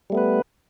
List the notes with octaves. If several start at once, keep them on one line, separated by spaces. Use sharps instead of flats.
G3 A3 B3 B4